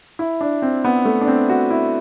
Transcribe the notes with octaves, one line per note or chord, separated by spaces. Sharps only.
E4
D4
C4
B3
A3
D4
C4
F#4
E4